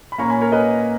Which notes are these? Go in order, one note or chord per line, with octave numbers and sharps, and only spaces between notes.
B5
A#2 A#3 C#4 A#5 C#6
G#5 B5
A#4 C#5
B4 D#5